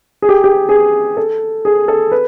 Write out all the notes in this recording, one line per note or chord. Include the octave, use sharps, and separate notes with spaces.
G#4
G4
G4
G#4
A4
G#4
A4
B4